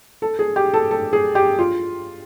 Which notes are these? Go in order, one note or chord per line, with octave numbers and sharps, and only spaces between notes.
A4
G#4
G4
A4
A4
G#4
G4
F4